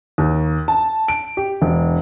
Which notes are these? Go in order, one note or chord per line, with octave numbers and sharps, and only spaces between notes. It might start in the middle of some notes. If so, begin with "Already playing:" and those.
D#2
A5
D7
G4
E1